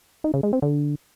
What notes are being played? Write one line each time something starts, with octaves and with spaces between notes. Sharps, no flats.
D#4
C#3
G#3
C4
D3